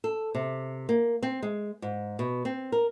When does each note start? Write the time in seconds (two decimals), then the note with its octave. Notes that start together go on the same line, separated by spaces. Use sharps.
0.04 A4
0.35 C3
0.89 A#3
1.23 C4
1.42 G#3
1.82 G#2
2.19 B2
2.45 C4
2.72 A#4